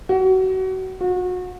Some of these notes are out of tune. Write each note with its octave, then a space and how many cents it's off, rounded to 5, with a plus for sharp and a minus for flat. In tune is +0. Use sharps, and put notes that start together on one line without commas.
F#4 +30
F#4 -30